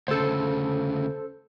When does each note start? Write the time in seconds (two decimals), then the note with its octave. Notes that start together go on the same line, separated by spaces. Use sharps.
0.08 D2 C#3 A4 C5